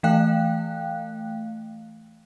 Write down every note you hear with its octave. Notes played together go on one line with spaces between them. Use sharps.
E3 A3 F5 G5 F#6